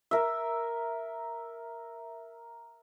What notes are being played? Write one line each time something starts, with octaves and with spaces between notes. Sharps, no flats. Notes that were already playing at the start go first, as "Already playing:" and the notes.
A#4 E5